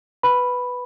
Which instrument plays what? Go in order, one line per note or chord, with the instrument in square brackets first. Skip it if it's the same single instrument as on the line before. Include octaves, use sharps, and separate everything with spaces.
[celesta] B4 B5